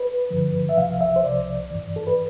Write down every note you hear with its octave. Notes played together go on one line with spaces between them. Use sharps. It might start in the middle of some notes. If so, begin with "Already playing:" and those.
Already playing: B4
G2 D3 F3
E5
C2 C3 F3 F5
E5
C5
C2 C3 F3 D5
G2 E3
A4
B4